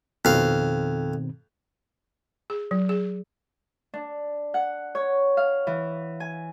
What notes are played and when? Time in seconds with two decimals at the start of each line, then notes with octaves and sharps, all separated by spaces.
0.25 F2 B2 D#3 C4 F5
2.50 G#4
2.71 F#3
2.89 G#4
3.94 D4
4.54 F#5
4.95 C#5
5.37 F5
5.67 E3
6.20 G#5